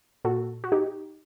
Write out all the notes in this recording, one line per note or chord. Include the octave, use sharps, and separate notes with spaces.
A#2 F#4 A4
F#4
D#4 G4